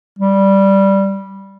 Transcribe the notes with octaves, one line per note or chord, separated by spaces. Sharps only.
G3